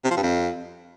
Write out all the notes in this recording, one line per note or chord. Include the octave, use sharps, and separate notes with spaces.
C3
F3
G2
F2